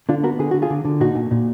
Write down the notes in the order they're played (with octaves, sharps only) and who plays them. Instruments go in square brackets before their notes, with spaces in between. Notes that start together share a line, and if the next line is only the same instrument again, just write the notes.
[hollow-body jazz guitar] D3 D4 F4
B3 F#4 A#4
D3 G#4
D3 F#4
F4 G#4
D3
D3
A#2 D#4 F#4
A#2
A#2